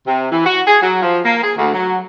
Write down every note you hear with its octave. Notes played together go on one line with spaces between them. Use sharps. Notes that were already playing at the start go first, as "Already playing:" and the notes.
C3
E3
F#4
G#4
F#3
F3
A#3
G#4
D2
F#3